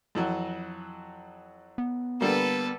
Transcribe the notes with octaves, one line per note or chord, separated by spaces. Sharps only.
F2 E3 F#3
B3
D3 G3 A#3 A4 B4